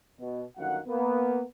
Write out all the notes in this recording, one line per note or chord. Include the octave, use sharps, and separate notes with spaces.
B2
G1 F#2 D#3 F5 F#5
A#3 B3